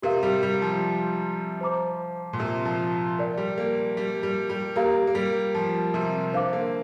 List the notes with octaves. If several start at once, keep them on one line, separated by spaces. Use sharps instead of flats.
C3 G4 A#4 F5
G3
G3
F3
C5 A#5 D6
A#2
C3
F3
A#4 D5 G5
G3
A#3
G3
G3
G3
A#3 G4 A#4 F5 A#5
A#3
G3
F3
C3
D3 C5 F5 D6
A#3